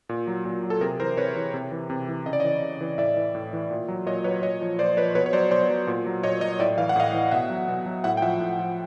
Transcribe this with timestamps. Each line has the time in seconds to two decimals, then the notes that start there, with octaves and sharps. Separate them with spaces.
0.09 A#2
0.27 F#3
0.45 A#2
0.63 F#3
0.70 A4
0.81 C3 G#4 A#4
0.99 E3 A#4 C5
1.17 C3 B4 C#5
1.36 E3
1.54 C3
1.71 E3
1.90 C3
2.08 E3
2.26 C#3 D#5
2.33 D5
2.40 E3 C#5 D#5
2.62 C#3
2.81 E3
2.98 A2 D5 E5
3.17 E3
3.35 A2
3.53 E3
3.71 A#2
3.88 F#3
4.06 A#2 C#5 D#5
4.24 F#3 B4 C#5
4.43 A#2 C#5 D#5
4.61 F3
4.79 A#2 C5 D5
4.97 F3 B4 C#5
5.15 B2 B4 C#5
5.26 C#5
5.33 F#3 C5 D5
5.51 B2 C5 D5
5.70 F#3
5.87 A#2
6.06 F#3
6.23 A#2 C#5 D#5
6.41 F#3 C#5 D#5
6.59 A2 D5 E5
6.78 E3 F5
6.89 F#5
6.96 A2 D#5 F5
7.14 E3
7.31 B2 E5 F#5
7.50 F#3
7.68 B2
7.86 F#3
8.04 A2 E5 F#5
8.17 G5
8.22 F3 E5 F#5
8.40 A2
8.59 F3